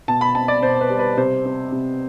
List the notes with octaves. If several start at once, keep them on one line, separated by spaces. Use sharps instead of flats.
B2 A5
B5
C4 A5
D5
B2 C5
B4
G3
B4
C3 C5
C4
C3